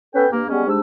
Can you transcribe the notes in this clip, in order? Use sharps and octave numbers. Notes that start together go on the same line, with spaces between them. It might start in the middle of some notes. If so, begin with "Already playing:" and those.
B3 C#4 A4 B4 G5
G2 A#3
G3 G#3 B3 C#4
G#2 G3 G#3 D4 E6